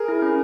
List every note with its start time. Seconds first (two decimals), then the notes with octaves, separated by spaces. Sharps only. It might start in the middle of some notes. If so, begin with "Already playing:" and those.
Already playing: G#4 A#4
0.08 E4
0.22 C#4